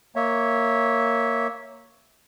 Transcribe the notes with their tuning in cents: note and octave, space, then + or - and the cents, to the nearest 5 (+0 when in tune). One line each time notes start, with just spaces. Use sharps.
A#3 -5 C#5 +0 E5 -15